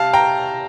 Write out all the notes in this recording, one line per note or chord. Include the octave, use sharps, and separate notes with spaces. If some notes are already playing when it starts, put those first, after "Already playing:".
Already playing: C3 F5 A5
G5 A#5